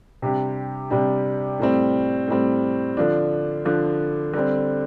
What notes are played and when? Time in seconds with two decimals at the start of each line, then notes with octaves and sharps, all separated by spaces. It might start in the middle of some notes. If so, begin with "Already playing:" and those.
0.22 C3 G3 D4 G4
0.91 C3 G3 D4 G4
1.59 A2 G3 C4
2.28 A2 G3 C4
2.97 D3 F3 D4
3.65 D3 F3 D4
4.34 D3 G3 C4